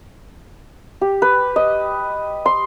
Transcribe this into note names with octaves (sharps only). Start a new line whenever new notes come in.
G4
B4
D#5
C6